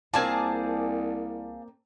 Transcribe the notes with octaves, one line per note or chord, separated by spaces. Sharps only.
C2 A#3 C4 F4 G#4 D5 G#5 A5